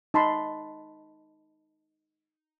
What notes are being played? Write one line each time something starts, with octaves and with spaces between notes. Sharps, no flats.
D#4 A5 B5 C6